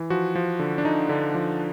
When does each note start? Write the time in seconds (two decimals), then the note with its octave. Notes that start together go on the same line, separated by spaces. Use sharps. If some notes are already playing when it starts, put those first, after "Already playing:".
Already playing: E3
0.10 F3 F#4
0.35 F3
0.59 D3
0.78 D4
0.85 D3 D#4
1.09 D3
1.34 F3